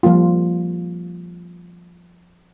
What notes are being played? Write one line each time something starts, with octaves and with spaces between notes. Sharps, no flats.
F3 G3 A#3 F4